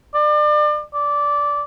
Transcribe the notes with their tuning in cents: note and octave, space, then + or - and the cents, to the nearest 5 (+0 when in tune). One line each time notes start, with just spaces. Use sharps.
D5 +35
D5 -15